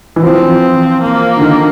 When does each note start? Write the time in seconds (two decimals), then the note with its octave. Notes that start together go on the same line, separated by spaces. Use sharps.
0.16 E3
0.22 F3 C4
1.02 A#3
1.37 D3
1.41 D#3